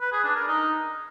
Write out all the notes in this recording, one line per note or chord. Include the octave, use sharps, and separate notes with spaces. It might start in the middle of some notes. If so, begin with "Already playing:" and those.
B4
G#4
D4
A#4
D#4